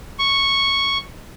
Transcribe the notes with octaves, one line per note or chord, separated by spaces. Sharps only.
C#6